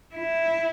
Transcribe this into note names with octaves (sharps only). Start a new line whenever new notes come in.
E4